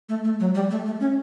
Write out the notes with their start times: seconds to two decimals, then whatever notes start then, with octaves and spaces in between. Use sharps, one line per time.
0.09 A3
0.24 A3
0.40 F#3
0.55 G3
0.71 A3
0.86 A3
1.00 C#4